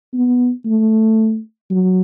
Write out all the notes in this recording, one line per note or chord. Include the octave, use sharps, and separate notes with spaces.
B3
A3
F#3